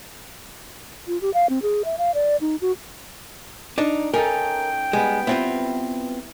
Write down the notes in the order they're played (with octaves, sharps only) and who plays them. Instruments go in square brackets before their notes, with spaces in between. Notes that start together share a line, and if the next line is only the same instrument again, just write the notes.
[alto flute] F4
G4
F5
C4
G#4
E5
F5
D5
D#4
F#4
[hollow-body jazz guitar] D4 D#4
[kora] C#4 D#4 A4 [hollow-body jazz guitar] A#4 [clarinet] G5
[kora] G3 B3 [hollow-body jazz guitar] G#3
[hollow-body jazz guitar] B3 C4 F4 [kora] E4